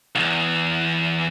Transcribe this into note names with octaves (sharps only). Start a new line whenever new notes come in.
B1 E2